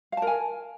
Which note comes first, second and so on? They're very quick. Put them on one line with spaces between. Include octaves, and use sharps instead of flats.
F5 A5 A#4 G#5